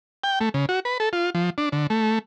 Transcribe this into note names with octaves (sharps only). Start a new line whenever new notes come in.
G5
A3
C#3
F#4
B4
A4
F4
F3
D4
D3
A3